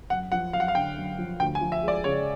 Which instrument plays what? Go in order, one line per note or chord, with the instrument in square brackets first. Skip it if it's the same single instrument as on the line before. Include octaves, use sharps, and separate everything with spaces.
[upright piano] F#2 [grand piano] F#5
[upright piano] F3 [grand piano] F#5
[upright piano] F#2 [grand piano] F5
[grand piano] F#5
F5
[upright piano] D3 [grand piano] G5
[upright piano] F#2
F3
[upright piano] D2 [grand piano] G5
[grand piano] G#5
[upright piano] F3
[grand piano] E5
[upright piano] G#3 [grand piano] D5
[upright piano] C#3 [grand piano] C#5